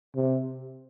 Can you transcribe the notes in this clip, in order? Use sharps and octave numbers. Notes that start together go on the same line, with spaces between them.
C3